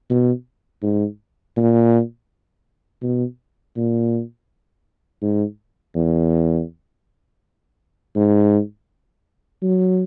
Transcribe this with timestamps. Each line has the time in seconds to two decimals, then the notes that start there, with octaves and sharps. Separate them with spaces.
0.10 B2
0.83 G#2
1.57 A#2
3.02 B2
3.76 A#2
5.22 G#2
5.95 E2
8.16 G#2
9.62 F#3